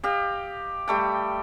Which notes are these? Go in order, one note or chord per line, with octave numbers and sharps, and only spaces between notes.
G4 D#5 F5
G3 A3 G5